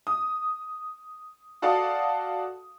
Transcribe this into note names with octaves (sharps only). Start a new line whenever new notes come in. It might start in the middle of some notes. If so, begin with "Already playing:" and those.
D#6
F#4 A4 D5 F5 A5 D#6